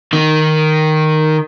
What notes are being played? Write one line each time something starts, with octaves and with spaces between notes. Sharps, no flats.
D#3 D#4